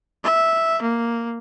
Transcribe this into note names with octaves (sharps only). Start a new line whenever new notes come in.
E5
A#3